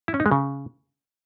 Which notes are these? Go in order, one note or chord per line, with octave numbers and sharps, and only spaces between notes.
E4
C#4
D#4
G#3
C#3